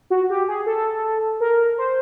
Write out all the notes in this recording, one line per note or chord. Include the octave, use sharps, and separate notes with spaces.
F#4
G4
G#4
A4
A#4
C5